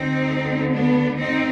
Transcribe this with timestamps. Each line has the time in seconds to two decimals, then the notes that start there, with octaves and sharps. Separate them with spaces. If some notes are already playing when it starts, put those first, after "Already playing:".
Already playing: D2 D3 C4 D#4
0.72 B3 D4
1.17 C4 D#4